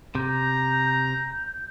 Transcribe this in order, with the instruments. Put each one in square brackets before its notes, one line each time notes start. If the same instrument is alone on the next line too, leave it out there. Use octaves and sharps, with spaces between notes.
[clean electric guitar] C3 [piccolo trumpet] A#5 [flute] G6